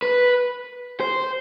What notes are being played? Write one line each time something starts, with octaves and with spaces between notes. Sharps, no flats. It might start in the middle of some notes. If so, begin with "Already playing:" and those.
B4
C5